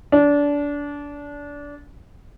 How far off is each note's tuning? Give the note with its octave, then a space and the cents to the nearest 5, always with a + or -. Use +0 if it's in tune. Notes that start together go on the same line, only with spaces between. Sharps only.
D4 -25